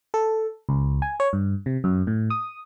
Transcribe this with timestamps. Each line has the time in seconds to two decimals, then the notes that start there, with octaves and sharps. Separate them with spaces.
0.14 A4
0.69 C#2
1.02 G#5
1.20 C#5
1.33 G2
1.66 C3
1.84 F#2
2.07 A2
2.30 D#6